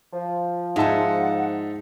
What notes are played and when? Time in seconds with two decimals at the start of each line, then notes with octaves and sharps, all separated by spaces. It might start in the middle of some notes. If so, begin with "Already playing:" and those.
0.12 F3
0.76 G#2 D#4 E5 F#5 G#5 A5